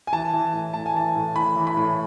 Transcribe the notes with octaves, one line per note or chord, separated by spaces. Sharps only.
G#5
E3 A5
E3
A2
A2 A5
G#5
E3 A5
A2
E3 B5
E3
B5
A2